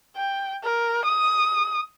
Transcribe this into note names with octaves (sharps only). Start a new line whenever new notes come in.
G5
A#4
D#6